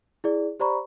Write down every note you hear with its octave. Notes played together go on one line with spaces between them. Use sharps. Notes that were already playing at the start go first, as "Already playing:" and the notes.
E4 G#4 D5
G4 C5 D5 A#5 B5 C#6